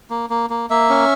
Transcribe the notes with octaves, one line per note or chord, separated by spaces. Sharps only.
A#3
A#3
A#3
A#3 E5
C#4